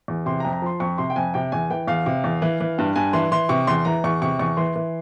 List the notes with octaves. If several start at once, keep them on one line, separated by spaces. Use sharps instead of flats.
E2
C3 C6
A#5
F2
A#5
F3 C6
F2 C#6
C3 C6
G5
F2 G#5
C3 G5
E2 G#5
E3 G5
E2 F5
C3
E2
E3
E3
G2
G2 G#5
E3 C6
E3 C6
C3 C#6
E2 C6
E3 A#5
E2 C#6
C3 C#6
E2 C#6
E3 C6
E3